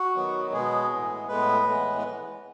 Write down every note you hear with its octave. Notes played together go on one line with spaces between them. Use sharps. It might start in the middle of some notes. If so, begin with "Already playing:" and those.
Already playing: F#4
D#3 F#3 B3
B2 G#3 B3 G#4
A2 E3 G#3 B3
A2 G#3 B3 B4
A2 E3 G#3 B3
B4